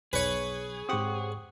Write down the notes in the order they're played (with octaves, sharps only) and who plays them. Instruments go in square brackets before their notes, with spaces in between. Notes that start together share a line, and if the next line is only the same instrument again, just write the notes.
[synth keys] B1 G#6 [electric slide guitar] G#4 [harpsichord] B4 C#5
[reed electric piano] G#2 C#6 D#6 [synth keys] C4 G4 F#5